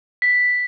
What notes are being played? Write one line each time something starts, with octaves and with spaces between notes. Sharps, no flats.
B6